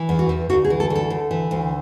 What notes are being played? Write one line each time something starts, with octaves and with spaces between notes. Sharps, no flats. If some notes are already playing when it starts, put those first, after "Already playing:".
Already playing: E3
E2
F#4
E2
D2 F#4
G#4
E3
A4
D2
A4
D2
E3
D2